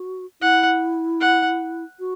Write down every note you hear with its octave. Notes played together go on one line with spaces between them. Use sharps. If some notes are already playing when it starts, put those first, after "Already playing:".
Already playing: F#4
E4 F#5
F#5
F#4